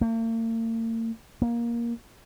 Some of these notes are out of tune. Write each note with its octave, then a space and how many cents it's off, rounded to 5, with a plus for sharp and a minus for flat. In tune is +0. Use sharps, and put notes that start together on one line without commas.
A#3 -45
A#3 +15